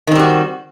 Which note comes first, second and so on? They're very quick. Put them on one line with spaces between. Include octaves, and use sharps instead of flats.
D#3 C4 G3 F#4